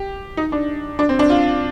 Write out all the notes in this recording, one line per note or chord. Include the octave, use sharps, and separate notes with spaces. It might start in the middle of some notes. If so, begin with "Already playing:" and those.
Already playing: G4
D#4
D4
D4
C4
D4
F4